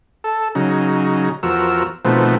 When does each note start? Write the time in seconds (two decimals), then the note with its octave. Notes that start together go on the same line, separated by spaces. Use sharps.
0.24 A4
0.55 C#3 F#3 D#4
1.43 E2 F3 F#4 A#4 E6
2.05 B2 D#3 F3 A3 B3 C4